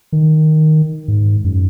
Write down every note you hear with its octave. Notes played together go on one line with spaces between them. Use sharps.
D#3
G#2
F#2